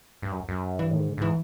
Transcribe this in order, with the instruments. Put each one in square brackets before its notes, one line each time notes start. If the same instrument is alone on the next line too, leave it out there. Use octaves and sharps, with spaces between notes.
[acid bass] G2
F#2
F#2
[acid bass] G2 [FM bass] E3
[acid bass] A2 [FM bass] D#3
[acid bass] G#2
[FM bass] D3
[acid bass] G#2 [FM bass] E3